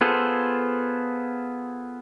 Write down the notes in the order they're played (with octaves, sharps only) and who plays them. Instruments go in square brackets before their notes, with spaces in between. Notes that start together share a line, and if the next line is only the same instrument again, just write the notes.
[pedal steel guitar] B3 F4 G#4 A4 C5